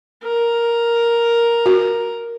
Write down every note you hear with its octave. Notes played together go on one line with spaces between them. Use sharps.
A#4
F#4